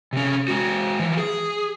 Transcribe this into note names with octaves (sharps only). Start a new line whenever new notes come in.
C3 C#4
G#3 F#4
E3 F3
G#4